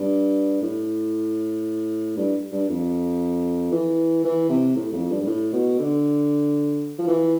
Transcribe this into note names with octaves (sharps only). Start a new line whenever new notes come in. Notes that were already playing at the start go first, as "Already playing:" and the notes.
Already playing: G2
A2
G2
G2
F2
E3
E3
C3
A2
F2
G2
G2
A2
B2
D3
F3
E3